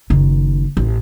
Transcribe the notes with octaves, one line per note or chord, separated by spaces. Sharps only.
F#1 D#3
A1